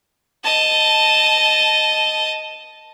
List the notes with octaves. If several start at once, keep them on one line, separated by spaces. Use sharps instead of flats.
D#5 A5